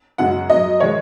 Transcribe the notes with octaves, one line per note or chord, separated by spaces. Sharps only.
F#2 C#3 G#3 F#5
F#2 F#3 D#5
D#3 G#3 C#5